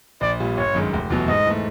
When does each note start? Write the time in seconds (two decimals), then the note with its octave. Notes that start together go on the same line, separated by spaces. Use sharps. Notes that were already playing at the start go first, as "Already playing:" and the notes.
0.21 A#1 D5
0.40 A#2 G3
0.57 G1 C#5
0.75 F#2 D#3 G#3
0.93 F1
1.10 E2 B2 F#3
1.28 G#2 D#5
1.46 E3 A3